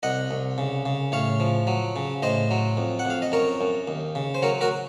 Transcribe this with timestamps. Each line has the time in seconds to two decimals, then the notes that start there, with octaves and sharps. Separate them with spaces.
0.03 C2 D#5 F#5
0.31 C2
0.58 C#3
0.86 C#3
1.12 A2 C#5 F5
1.40 F3
1.67 F#3
1.96 C#3
2.23 A2 C5 D#5
2.51 F#3
2.77 F2
2.99 F#5
3.05 F2 F5
3.22 D#5
3.32 F#2 A#4 C#5
3.61 F#2
3.88 D#2
4.15 C#3
4.35 C5
4.42 F#3 A#4 C#5
4.61 F#4 A#4